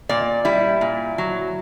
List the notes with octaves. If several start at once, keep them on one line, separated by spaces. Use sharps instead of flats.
A#2 D5
G3 E4
A#2
F#3